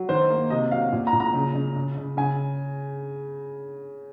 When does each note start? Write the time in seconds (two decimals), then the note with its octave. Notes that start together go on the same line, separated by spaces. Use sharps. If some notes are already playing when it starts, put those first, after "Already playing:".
Already playing: F#3
0.09 D#3 C5
0.30 A#3
0.50 C3 D#5
0.71 F#3 F5
0.92 A#2
1.07 A#5
1.13 A#2
1.20 A#5
1.34 C#3
1.55 C#3
1.76 C#3
1.97 C#3
2.17 C#3 G#5